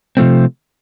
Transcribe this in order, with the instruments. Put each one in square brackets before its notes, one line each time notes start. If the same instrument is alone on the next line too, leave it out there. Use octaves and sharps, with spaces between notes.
[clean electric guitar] C3 F3 A3 C4